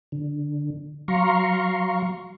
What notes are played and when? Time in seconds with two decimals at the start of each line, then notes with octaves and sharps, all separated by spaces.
0.12 D3
1.08 F#3 F5 A#5 C6 C#6